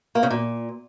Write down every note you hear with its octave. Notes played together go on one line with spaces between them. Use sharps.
A#3
C#3
A#2